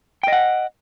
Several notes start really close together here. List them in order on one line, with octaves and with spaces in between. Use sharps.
G5 D#5 F#5